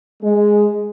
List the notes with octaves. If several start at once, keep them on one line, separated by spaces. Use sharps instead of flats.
G#3